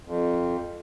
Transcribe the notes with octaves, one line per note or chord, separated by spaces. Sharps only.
F2